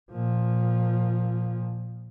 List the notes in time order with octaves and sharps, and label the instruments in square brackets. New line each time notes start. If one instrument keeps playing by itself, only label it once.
[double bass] A#2 F3